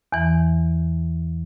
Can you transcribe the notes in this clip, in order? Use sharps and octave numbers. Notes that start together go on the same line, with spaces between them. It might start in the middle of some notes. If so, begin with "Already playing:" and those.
E2 E3